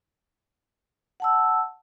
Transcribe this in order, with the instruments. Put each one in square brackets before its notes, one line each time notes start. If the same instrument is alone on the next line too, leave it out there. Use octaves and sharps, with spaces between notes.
[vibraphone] F#5 A5 E6